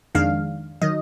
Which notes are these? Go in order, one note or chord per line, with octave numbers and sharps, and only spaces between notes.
F2 D#3 G#3 D4 F5
D#3 F#3 D#5